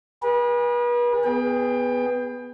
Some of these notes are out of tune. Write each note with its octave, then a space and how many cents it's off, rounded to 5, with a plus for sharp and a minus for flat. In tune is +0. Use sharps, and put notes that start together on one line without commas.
G#4 -30 B4 -40
B3 +0 G#4 +0 G5 +25